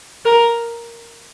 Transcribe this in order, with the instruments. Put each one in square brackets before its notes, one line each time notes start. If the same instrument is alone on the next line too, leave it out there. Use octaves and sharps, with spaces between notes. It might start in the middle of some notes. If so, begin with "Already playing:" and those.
[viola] A#4